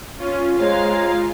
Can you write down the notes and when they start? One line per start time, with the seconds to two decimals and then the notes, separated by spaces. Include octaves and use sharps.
0.20 C#4 F4
0.58 G#3 C5 C#5 F5 A#5